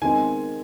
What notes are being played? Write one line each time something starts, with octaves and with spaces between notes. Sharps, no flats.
D#3 G#3 C4 G#5